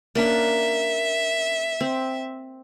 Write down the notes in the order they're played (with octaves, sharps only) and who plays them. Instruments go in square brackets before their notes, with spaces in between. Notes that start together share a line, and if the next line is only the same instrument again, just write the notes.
[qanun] A#3 C#4 D4 [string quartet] E5
[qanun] C4